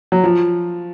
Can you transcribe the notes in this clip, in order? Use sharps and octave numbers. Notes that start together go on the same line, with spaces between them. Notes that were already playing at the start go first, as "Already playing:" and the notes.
F#3
F3